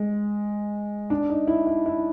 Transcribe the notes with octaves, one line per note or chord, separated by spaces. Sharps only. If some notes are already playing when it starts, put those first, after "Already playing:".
Already playing: G#3
D4
D#4
E4
E4
E4